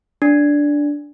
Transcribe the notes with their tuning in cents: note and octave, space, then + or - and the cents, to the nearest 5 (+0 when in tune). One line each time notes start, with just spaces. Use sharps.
D4 -5